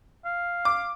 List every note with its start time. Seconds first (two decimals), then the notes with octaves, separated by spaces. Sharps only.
0.25 F5
0.65 D6